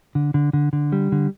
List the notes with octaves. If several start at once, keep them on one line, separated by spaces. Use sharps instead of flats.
D3
D3
D3
D3
G3
D3